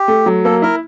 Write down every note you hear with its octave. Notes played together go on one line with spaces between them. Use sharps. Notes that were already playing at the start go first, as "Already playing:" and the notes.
Already playing: G4
A3
F#3
A#3 A4
E4 A#4